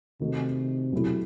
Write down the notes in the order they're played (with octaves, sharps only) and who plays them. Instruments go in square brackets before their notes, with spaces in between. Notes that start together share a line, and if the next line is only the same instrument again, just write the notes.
[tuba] C3 [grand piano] D#3 A3 D#4 F#4
[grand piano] B2 F#3 A3 E4 G4